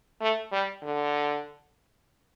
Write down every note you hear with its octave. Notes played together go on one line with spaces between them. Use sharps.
A3
G3
D3